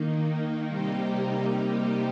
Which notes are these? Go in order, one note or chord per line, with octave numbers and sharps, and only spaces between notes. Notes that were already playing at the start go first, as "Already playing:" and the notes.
Already playing: D#3 A#3 D#4
C3 G3 A#3 D#4 G4